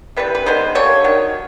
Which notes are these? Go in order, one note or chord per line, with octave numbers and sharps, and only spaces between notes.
C3 E3 G3 B4
B4
D#3 G#3 B3 C5
D3 G3 A#3 C#5
D#3 F#3